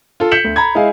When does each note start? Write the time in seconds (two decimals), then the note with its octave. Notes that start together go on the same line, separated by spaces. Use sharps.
0.20 F4 A4
0.31 G6 B6 C#7 E7 F#7
0.44 D2
0.56 A#5 B5 G#6
0.75 G#3 E4 G#4 D#5 F5 G#5